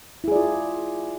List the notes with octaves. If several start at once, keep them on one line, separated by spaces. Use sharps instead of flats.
E4 F4 G#4 D5